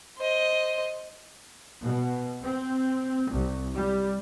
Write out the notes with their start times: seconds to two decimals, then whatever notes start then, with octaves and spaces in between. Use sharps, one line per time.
0.18 C5 D#5
1.83 B2
2.42 C4
3.29 C2
3.73 G3